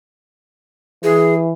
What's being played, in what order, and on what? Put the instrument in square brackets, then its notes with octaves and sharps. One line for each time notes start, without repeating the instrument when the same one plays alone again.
[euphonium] E3 [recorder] G#4